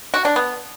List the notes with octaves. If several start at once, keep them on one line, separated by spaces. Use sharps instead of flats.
F#4
D4
B3